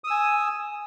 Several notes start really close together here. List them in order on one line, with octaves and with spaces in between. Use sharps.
D#6 E6 G#5